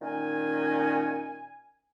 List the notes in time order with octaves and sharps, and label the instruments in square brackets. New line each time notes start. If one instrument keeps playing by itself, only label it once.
[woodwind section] A#2 D#3 C#4 G#5